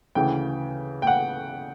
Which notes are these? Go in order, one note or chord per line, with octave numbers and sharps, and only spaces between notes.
D2 C#3 E3 G5
G5
F#5